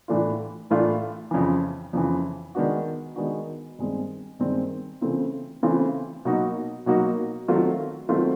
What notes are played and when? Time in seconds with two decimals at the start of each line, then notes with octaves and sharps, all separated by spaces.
0.08 A2 E3 A3 D4 F4
0.70 A2 E3 A3 D4 F4
1.31 F2 C#3 E3
1.93 F2 C#3 E3
2.55 D#3 G#3 B3 D4 F#4
3.16 D#3 G#3 B3 D4 F#4
3.79 G2 D#3 G#3 C4
4.39 G2 D#3 G#3 C4
5.01 C#3 E3 A3 C4 F4
5.63 C#3 E3 A3 C4 F4
6.25 B2 F#3 A#3 D#4 F#4
6.86 B2 F#3 A#3 D#4 F#4
7.48 D#3 F#3 A3 C4 F4
8.09 D#3 F#3 A3 C4 F4